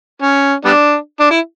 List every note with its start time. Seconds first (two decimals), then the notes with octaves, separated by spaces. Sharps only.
0.22 C#4
0.65 G3 B3 D4
1.20 D4
1.31 E4